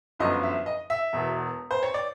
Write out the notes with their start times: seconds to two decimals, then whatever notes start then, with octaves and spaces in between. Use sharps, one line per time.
0.19 G1 F#2 D3 F3 D#5
0.43 E5
0.66 D#5
0.90 E5
1.13 E1 E2 B2
1.71 C5
1.83 C#5
1.94 D5